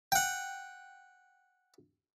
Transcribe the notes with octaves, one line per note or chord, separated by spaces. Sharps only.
F#5 G5